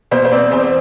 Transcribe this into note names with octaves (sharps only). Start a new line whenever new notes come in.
B2 C5
C5
C4 D5
E2 C5